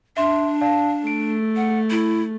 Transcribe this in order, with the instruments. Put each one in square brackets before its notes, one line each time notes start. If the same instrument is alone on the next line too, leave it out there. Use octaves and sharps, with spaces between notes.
[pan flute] D4 [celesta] E5 C6
[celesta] D5 F5 A5
[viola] A3 [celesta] D7
[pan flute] F#5
E4